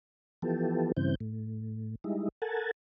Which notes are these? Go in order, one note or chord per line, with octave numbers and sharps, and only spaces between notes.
E3 F3 B3 G4 A4
G2 C#3 E3 C4 G6
A2
G3 G#3 D#4 E4
A4 A#4 F#5 G#5 A5